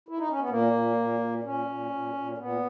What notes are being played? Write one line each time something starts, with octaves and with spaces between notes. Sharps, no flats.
E4
D#4
C#4
B3
A#2 A#3
A#2
A#2
A#2
A#2 C#4
A#2
A#2
A#2
A#2 B3